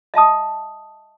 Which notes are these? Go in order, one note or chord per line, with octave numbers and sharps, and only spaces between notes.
D#5 E5 A5 D#6